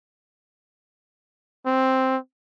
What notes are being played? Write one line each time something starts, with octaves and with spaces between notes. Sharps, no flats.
C4